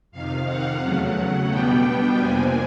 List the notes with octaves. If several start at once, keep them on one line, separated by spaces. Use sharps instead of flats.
F2 C3 D#3 F5
F#5
E2 C#3 F#3 A3
B2 G3 B3 D4 G5
F2 C3 F3 A#3 D4 G#5